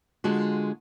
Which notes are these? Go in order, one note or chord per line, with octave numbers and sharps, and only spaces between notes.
D3 G#3 F4 F#4